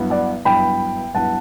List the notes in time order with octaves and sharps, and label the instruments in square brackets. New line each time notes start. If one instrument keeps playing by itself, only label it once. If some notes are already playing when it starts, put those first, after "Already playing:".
Already playing: [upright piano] G2 F#3 B3 E4
[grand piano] D5 F#5
[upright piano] G2 F#3 B3 E4 [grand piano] G5 B5
[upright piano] G2 F#3 B3 E4 [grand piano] F#5 A5